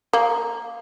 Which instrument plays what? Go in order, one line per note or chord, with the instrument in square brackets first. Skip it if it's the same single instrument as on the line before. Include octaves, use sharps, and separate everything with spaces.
[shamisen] A#3